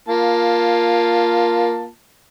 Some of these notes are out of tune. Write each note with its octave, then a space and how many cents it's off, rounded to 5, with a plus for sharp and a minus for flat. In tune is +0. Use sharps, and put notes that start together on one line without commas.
A#3 +10 F4 +0 A5 +10